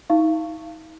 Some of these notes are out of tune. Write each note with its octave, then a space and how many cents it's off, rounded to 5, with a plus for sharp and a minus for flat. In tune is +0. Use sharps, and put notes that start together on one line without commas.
D#4 +35 F5 -25 C#6 +0